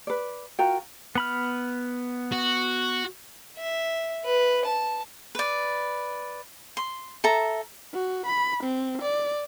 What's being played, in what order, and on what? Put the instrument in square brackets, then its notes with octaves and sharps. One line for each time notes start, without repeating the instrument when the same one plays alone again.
[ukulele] B4 D5
F4 F#4 A#4 G5
[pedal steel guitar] B3 B5 F6
[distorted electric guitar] F#4
[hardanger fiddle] E5
B4
A5
[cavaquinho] B4 D5
C6
A4 E5 A#5
[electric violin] F#4
B5
C4
D5